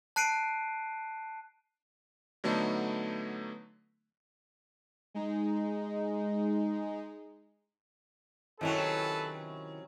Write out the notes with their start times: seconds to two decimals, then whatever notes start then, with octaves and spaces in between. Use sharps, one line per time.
0.16 A5 F#6 C7 D7 D#7
2.44 D3 F#3 A3 B3 D#4
5.14 G#3 D#4
8.61 C3 D#3 F#3 C#4 E4 A4 B4 F#5